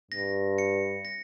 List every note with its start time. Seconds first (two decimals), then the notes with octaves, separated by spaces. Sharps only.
0.11 G2 A#6
0.58 C#7
1.05 A#6